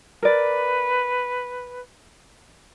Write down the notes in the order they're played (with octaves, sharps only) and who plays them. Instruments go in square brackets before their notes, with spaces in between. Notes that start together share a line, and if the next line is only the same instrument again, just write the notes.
[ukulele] A#4 D5 [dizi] B4